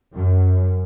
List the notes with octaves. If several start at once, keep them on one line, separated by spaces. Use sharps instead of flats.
F#2